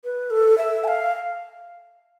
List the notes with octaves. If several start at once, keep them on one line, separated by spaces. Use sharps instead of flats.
B4
A4
E5
A5
F5